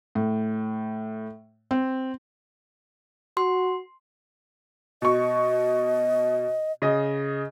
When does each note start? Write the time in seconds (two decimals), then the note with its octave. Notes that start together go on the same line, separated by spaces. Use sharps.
0.15 A2
1.71 C4
3.37 F#4 C6
5.02 B2 D#5 C#6
6.82 C#3 D#5